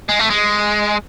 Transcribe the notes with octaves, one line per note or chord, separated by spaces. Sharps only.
G#3
A3
G#3